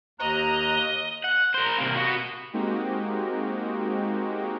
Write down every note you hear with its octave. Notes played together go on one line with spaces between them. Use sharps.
D#2 D#5 A#5 F#6
F#5
A#4 C5
C3 A#3
B3 F#4
G#3 A#3 C4 D#4 F#4 G4